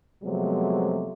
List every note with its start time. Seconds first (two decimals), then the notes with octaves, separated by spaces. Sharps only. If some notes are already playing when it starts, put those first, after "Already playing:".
0.23 C3 F3 F#3 G#3 A3 B3